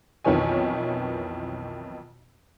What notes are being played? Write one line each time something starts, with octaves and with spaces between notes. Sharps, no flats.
B1 F2 D#3 E3 C#5 G#5